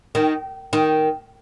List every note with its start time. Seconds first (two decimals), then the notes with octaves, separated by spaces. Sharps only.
0.15 D#3
0.73 D#3